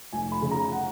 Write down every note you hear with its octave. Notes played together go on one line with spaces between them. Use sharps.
F1 G#5
B5
C#3
A#5
F#5